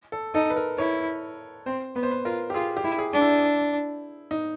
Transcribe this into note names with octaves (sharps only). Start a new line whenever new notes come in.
A4
D#4 A4
B4
A#4
E4 C#5
C4 C5
B3 B4
C5
B4
F4 A#4
G4
F4 G#4
G4
E4
G#4
D4
E4
D#4